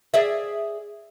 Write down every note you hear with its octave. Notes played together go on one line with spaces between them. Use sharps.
G#4 D5 E5